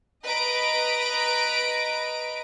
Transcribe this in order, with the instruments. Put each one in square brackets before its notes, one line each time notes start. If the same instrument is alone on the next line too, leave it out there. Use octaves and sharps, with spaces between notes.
[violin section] B4 D#5 A#5 D7